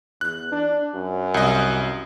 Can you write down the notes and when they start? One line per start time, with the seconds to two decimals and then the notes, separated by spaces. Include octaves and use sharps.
0.21 E2 F#6
0.52 D4
0.95 F#2
1.34 C2 D#5